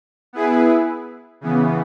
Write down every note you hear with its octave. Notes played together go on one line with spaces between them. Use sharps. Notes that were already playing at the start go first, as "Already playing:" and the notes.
B3 E4 G#4 B4
C#3 E3 B3